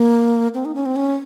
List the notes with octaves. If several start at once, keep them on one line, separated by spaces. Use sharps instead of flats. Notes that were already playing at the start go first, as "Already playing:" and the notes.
Already playing: A#3
C4
D#4
C#4
C4
C#4